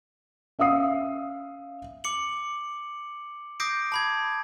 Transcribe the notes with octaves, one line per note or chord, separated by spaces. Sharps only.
C#4 E5 F5 D#6 C7
D6 C#7 F#7
D6 D#6 G6 A#6 C7 D7
A5 B5 G#6